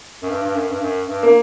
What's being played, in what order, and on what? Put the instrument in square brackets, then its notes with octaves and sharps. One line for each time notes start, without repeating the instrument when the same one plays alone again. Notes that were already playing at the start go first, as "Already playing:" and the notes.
[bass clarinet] F#2
G2
G2
F#2
G2
F#2
G2
[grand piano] A#3